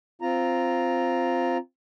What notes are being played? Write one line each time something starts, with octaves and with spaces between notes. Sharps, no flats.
C4 F4 A#5